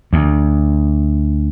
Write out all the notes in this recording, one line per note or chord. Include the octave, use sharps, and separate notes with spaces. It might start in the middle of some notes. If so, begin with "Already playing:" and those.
D2